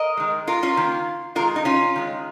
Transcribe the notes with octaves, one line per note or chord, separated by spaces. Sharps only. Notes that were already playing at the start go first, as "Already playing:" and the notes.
Already playing: A#4 D#5
D#3 G#3
F4 A#4
C#4 F4
D#3 A#3
D#3 G#3 F4 A#4
D#4
C#4 F4
D#3 G#3